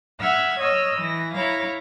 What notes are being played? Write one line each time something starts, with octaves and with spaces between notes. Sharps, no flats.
E5 F#5 E6 F6 G#6
C#5 D#5 E6 F6
E3 A#6
E4 C#5 F5 A#5